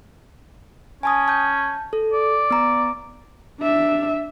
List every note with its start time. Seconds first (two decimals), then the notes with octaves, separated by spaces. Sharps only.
1.03 C#4 G#5 A5 D#6
1.28 A5 G6
1.93 A4
2.13 D5
2.51 B3 A#5
3.60 D4 E5